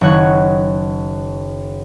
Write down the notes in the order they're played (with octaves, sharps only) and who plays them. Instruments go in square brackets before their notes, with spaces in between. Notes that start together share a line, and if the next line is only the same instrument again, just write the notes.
[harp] F#1 D#3 C#5 F#5 F#6 G#6